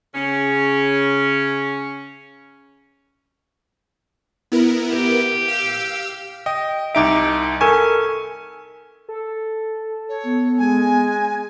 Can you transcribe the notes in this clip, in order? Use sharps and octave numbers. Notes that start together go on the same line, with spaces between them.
C#3 C#4
B3 E4 A#4
G4
F5 E6
D#5 G5
C2 D#4 E5 A#5 D6 D7
A4 A#4 G#5 C#6
A4
C#5
B3
G#3 G#5